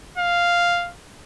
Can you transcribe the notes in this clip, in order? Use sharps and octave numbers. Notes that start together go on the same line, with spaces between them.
F5